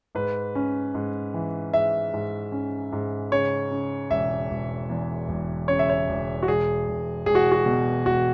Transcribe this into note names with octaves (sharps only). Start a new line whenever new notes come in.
G#2 B4
C#4
G#2
E3
G#2 E5
G#2
C#4
G#2
C#3 C#5
C#3
E1 E5
E1
E2
E1
C#3 C#5
E5
C#5
E1
F#4
E1 G#4
E1
E1 G#4
F#4
F#4
B2
E1 F#4